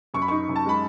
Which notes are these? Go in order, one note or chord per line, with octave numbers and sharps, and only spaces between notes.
F#2 C#6
B5
D#4 C#6
F#2
A5
G#3 B5